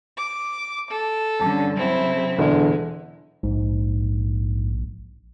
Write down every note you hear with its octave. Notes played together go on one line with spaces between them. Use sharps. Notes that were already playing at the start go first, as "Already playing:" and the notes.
D6
A4
G2 D3 C#4 A5
C#3 F#3 C4 E4
E1 D3 G#3
A#1 G#2